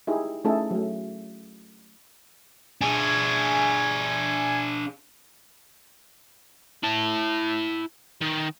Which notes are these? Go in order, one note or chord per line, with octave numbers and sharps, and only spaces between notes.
D#4 E4 G4 G#4
A3 C#4 D#4 E4 G#4 A4
F#3 A3
D4 G#4 G#5
E4 A5
D#3